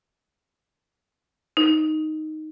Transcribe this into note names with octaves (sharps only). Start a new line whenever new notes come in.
D#4